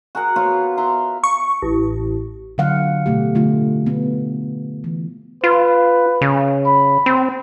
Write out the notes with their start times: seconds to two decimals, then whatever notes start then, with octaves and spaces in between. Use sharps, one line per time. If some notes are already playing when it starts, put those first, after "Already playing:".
0.15 F#4 G#4 A#4 F#5
0.36 B3 F4 C#5
0.77 E5 A#5 C6
1.24 C#6
1.62 A1
2.58 D3 F#3 F5 F#5
3.06 B2 A3 G4
3.35 D3 A3 F4
3.87 B3
4.84 E3
5.44 F4 B4
6.21 C#3
6.66 B5
7.06 C4